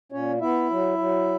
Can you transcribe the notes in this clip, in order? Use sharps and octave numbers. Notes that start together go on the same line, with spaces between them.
A#2 C#4 C#5
B3 E4 E5
F#3
F#3